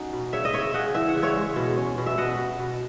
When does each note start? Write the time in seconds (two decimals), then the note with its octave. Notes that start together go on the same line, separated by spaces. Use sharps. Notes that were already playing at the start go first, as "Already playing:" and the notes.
Already playing: C#4 D#4 F#4
0.13 B2
0.33 C#3 C#5 E5
0.45 D#5
0.53 C#3 C#5 E5
0.74 C#3 D#5 F#5
0.95 E3 E5
1.09 F#5
1.16 C#3
1.23 C#5 E5
1.36 G#3
1.56 B2
1.77 C#4
1.98 B2
2.06 E5
2.18 B2 D#5 F#5
2.38 B2
2.59 B2